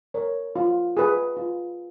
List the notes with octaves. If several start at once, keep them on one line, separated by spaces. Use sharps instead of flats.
A#4 C#5
F4
G#4 B4
F4